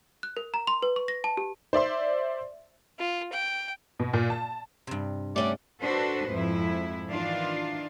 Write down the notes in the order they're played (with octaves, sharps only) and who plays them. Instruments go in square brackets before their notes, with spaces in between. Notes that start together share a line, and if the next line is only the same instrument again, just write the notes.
[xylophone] F#6
A#4
A#5
C6
B4
C#6
A#6
A5
G4
[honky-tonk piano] C5 D5 E5 C6
[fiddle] F4
G5
[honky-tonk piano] B2
A#2
A5
[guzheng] G2 C3
[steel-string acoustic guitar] G3 C#4 F#5 [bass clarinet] A3 [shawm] D5
[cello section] D4 F#4 A4 B4 C5
F2 G#2 E4
D#3 E3 D4 F4 D5 F5